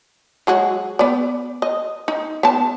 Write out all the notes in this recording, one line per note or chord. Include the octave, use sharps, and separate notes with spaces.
F#3 G#3 F#4
B3 D5
D#5
D#4
B3 A5